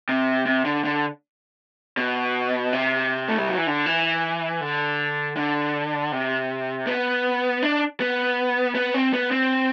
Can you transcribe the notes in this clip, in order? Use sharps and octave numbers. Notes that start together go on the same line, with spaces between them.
C3
C3
D3
D3
B2
C3
A3
G3
F#3
E3
D3
E3
D3
D3
C3
B3
D4
B3
B3
C4
B3
C4